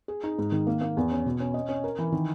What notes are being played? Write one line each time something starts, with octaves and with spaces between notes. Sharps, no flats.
G#4
D#4
G#2
D#3
A#3
A#3
E2
C#4
B2
C#4
D#5
C#4
A#4
E3
D#3